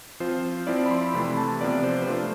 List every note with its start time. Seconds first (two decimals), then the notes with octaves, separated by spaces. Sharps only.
0.20 F3 C4 F4 C5
0.67 F3 C4 E4 D5
0.86 B5
0.91 C6
1.13 C3 E3 A3 E4 B5
1.37 A5
1.61 C3 F3 B3 F4 D5
1.84 C5
2.02 B4
2.07 F3 A3 D4 F4 C5